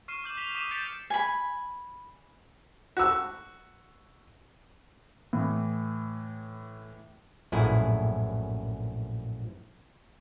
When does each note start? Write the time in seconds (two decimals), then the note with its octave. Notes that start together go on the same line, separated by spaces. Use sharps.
0.08 C#6 F6 C7 D#7 E7
0.24 D6 G6 F#7
0.37 B6 F7 G7
0.55 D6 D#6 B6 D#7 E7 F#7
0.71 G6 A6 B6 C#7 D7 E7
1.10 G#5 B5
2.97 F#4 E6
5.33 A2 E3
7.52 A#1 F#2 A2 E4 G#4